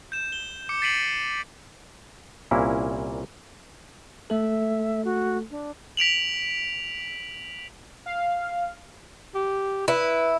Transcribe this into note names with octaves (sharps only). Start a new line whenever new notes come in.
G6 E7
G7
D6 C#7
A6 B6 C7 D7 D#7 F#7
C2 A#2 A#3 C#4 E4
A3 A4 E5
F#4
D4
B6 D7 F7 F#7
F5
G4
E4 B4